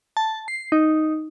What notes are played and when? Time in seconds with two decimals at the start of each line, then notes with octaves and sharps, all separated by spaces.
0.17 A5
0.48 C7
0.72 D#4